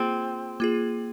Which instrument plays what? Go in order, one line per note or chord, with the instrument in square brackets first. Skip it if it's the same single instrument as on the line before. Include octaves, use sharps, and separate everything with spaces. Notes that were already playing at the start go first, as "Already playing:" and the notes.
Already playing: [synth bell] A#3 F4 G#4 [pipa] C4
[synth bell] A#3 F4 G#4